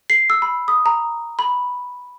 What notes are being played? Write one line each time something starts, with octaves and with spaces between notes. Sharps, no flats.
C7
E6
B5
D#6
A#5
B5